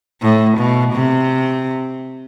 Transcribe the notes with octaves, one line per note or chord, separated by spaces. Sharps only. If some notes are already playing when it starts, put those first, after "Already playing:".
A2
B2
C3